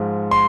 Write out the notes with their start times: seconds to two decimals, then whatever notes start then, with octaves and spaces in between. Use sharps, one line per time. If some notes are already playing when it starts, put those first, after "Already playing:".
Already playing: G#2 F3 G#3
0.31 C6